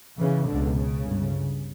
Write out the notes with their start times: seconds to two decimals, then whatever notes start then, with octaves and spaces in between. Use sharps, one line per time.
0.18 C#3 E3
0.46 B2 D3
0.51 C#2
0.75 C#3
1.03 G1 G2